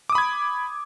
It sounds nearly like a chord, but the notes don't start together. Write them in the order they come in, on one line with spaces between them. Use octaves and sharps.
D6 D#6 B5 G#6